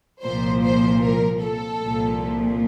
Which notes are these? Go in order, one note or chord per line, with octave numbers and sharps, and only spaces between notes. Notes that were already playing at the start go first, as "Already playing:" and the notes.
C2 A#2 F3 C5
C5
A#4
A4
C2 A#2 F3